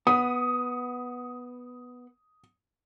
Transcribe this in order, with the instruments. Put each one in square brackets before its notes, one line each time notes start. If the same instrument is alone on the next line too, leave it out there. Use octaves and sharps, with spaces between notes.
[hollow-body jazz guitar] B3 [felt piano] D#6